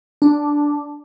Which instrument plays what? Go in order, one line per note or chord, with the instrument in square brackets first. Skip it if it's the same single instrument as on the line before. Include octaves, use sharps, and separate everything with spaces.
[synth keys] D4